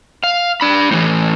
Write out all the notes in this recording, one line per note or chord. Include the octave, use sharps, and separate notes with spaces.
F5
D4 B5
A2 E3